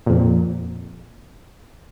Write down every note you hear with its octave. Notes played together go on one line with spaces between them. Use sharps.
F2 A#2